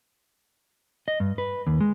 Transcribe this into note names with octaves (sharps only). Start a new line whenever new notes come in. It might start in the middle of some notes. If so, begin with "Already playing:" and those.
D#5
G2
B4
D#2
G#3